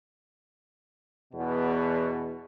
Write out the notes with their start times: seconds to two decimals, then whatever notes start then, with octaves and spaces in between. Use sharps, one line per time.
1.33 E2 B2